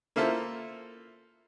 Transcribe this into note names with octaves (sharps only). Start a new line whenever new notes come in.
A#3 E4 F4 A4 C5